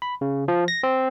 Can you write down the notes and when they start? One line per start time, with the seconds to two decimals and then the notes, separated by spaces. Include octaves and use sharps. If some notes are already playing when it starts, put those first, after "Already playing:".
0.02 B5
0.21 C#3
0.48 F3
0.68 A#6
0.83 C4